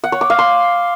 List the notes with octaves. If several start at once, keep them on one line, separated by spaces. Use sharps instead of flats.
F#5
C#5
D6
F5
C6